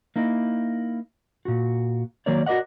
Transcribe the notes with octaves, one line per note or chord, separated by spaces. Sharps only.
A#3 D#4 E4
A#2 F#4
D#3 F#3 A#3 A#4 C#5 D5
F#4 A#4 D5 D#5 F#5